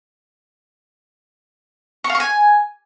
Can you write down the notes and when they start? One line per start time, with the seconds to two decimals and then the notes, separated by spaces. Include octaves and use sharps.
2.04 C#6
2.10 F5
2.15 C#6
2.20 G#5